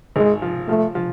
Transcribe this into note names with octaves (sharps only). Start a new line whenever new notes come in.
G#1 G#3
F3
F3 A3
F3